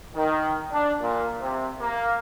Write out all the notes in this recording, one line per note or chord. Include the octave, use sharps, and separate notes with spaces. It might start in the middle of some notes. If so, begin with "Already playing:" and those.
D#3
D4
A#2
C3
A#3